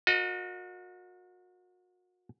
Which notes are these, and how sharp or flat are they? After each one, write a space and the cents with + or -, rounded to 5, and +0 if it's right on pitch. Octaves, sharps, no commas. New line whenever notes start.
F#4 -35 A#4 +0 D#5 +0